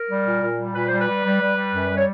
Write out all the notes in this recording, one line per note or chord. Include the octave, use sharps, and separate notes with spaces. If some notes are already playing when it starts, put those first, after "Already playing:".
Already playing: A#4
G3
A#2
A#2
G3
A#2 B4
G3 C5
B4
G3
G3
G3
G3
F#2
G3
C#5